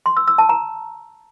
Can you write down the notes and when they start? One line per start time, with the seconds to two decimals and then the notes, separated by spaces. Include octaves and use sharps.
0.06 C6
0.17 E6
0.27 E6
0.38 A5
0.49 A#5